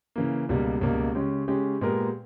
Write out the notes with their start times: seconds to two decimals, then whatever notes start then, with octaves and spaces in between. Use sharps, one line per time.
0.16 C#3 E3 A#3
0.49 C#2 B2 G3 A#3
0.81 C#2 B2 G3 A#3
1.15 C#3 G#3 C#4 G4
1.48 C#3 G#3 C#4 G4
1.81 A#2 G#3 B3 G4 A#4